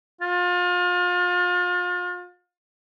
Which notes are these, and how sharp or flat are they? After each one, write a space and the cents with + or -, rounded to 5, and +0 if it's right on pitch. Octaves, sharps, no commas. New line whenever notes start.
F4 +35